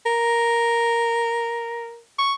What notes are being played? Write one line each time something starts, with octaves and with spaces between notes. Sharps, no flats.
A#4
C#6